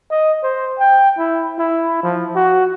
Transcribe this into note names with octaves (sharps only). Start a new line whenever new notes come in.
D#5
C5
G5
E4
E4
F3
F#4